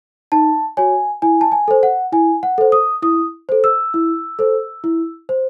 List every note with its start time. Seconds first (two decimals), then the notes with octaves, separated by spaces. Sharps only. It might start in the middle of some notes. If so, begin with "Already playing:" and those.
0.32 D#4 A5
0.77 F#4 C#5 G#5
1.22 E4 G#5
1.41 A5
1.52 G#5
1.68 A4 C5
1.83 F#5
2.13 E4 G#5
2.43 F#5
2.58 A4 C5
2.72 D#6
3.02 E4 D#6
3.49 A4 C5
3.64 E6
3.94 E4
4.39 A4 C5
4.84 E4
5.29 C5